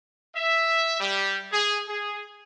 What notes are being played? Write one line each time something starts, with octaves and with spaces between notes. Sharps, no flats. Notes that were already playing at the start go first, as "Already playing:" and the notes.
E5
G3
G#4
G#4